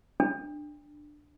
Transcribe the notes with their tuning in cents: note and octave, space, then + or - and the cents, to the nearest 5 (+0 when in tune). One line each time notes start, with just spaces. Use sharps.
D4 +15